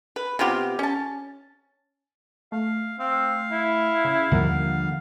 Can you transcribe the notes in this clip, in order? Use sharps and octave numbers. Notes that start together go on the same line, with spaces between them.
B4
C3 B3 F4 G4
C#4 A5
A3 F5
C4 F5
E4
C#3
D#2 D3 F3 G3 A#3 F#5